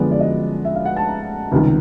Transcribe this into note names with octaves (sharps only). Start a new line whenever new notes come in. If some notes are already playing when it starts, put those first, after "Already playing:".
Already playing: F#2 D3 F3 G#3 B3 D5
D5
D#5
E5
F5
F#5
A5
A#5
C#2 C3 D#3 G3